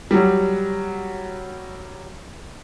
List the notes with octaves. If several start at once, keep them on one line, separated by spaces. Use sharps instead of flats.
F#3 G3